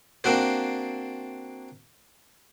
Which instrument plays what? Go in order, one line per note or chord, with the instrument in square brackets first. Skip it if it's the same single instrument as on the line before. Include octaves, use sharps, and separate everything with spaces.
[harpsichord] A#3 C4 D4 F#4 C5